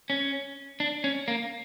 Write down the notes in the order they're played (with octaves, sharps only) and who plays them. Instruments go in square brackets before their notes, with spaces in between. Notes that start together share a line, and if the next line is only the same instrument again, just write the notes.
[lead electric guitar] C#4
D4
C#4
A#3